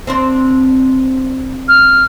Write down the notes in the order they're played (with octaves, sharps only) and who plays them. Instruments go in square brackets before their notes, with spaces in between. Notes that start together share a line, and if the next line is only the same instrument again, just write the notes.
[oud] C4 D4 C5
[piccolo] F6